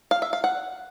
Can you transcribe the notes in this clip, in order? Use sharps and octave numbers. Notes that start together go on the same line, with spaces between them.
F5
E5
F5
F#5